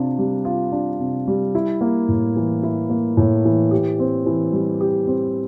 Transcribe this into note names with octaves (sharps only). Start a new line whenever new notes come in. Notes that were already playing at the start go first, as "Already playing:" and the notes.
Already playing: C3 D4 F4
G3
F4
D4
C3
G3
E4
A#3
A2
E3
E4
A#3
A2
E3
G4
C4
E3
G3
G4
C4